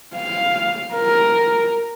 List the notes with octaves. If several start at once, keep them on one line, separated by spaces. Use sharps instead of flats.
F5
A#4